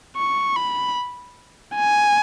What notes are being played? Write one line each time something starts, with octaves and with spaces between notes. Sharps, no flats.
C#6
B5
G#5